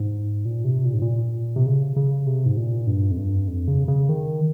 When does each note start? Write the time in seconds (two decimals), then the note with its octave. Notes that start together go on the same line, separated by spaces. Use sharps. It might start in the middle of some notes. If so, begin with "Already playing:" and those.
Already playing: G#2
0.45 A#2
0.65 C3
0.85 A#2
0.94 G#2
1.02 A#2
1.56 C3
1.66 C#3
1.96 C#3
2.27 C3
2.46 G#2
2.57 A#2
2.87 G2
3.11 F2
3.18 G2
3.48 F2
3.68 C#3
3.88 C#3
4.09 D#3